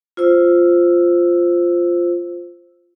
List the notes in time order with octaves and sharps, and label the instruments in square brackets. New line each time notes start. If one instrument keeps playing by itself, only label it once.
[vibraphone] F4 C5 E6